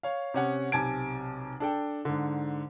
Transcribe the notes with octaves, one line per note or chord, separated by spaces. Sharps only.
C#5 F5
C3 C#4 F#5
B1 C3 G#5 A5 G#6 D7
D4 A4 G5
G#2 D3